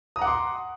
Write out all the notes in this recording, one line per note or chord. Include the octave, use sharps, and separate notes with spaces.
F#5 A#5 C6 D6 D#6